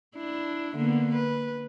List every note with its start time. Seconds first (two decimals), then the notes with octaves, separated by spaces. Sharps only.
0.16 D4 E4
0.76 D3 A#3 B3
1.14 B4